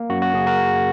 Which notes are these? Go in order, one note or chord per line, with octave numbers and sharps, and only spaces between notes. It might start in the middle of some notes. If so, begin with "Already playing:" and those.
Already playing: A#3
F#2 F#4
F#4
C#3 G#4
F#4 A#4